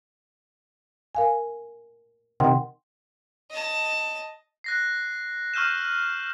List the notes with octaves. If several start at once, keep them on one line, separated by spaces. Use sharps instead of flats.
A#4 F5 G#5
C3 D#3 F#5 G5 C6
D#5 A5
F#6 A#6 C7
C#6 E6 F6 G6 D#7 E7